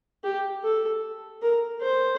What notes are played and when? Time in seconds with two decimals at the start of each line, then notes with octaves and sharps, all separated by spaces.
0.24 G4
0.64 A4
1.42 A#4
1.82 C5